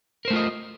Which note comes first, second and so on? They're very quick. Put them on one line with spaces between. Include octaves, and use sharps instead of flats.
A#4 C5 A3 F4 D#5